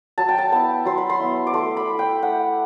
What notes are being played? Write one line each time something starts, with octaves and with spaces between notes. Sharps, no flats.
F#3 A5
G5
A5
B3 E4 A5
F#3 C6
B5
C6
B3 E4
D6
A3 C6
B5
E4
G5
A3 F#5